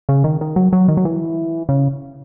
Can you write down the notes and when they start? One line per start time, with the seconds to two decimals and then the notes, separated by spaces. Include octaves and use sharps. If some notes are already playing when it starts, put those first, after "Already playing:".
0.09 C#3
0.24 D#3
0.41 D#3
0.56 F#3
0.73 F#3
0.88 D#3
0.97 F#3
1.05 E3
1.69 C#3